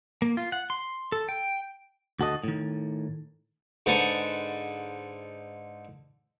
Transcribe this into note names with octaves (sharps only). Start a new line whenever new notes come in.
A#3
F4
F#5
C6
A4
G5
D2 F#4 A4 D#5
A2 D#3
G#2 D3 B4 F#5 G#5 A5